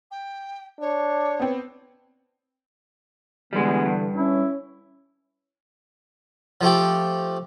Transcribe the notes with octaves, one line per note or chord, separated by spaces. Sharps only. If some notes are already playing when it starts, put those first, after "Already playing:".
G5
D4 C#5
B3 C4
D3 E3 G3 G#3 B3
G2
C#4 E4
F3 A3 G4